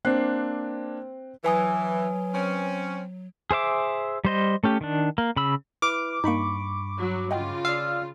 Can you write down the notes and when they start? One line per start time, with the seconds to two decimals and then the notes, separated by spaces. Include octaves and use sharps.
0.05 A#3 C4 D4 F#6 C7
1.44 E3 F#3 B4 G#5 D#6
2.35 C4 C#4
3.51 G#4 C5 E5 D6
4.25 G3 C5 D#5
4.64 A3 C#4 G4
4.81 D#3 D4
5.18 A#3
5.36 C#3 B5 E6
5.82 E4 B4 D6 F6
6.24 G2 A#3 D#4 B5 C#6
6.96 F#3
7.31 C#3 F4 D#5 F#5 G5
7.65 D5 F5 E6